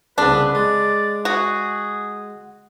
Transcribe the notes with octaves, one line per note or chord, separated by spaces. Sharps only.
C2 C#3 B3 D4 B4
G#3 D5
F#4 G#4